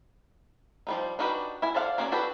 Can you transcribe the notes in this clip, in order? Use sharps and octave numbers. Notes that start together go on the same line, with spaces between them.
F3 G3 D#4
D4 D#4 F#4 G4 B4
E4 G#5
A4 C5 D5 F5 F#5
A#3 C#4 F#4 C#5 D5
D4 F#4 G4 A4 B4